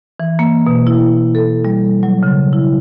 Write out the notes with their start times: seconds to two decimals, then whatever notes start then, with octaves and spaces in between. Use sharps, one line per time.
0.20 E3
0.39 A#3
0.67 B2
0.87 E4
1.35 A4
1.65 G3
2.03 F#3
2.23 C#3
2.53 E4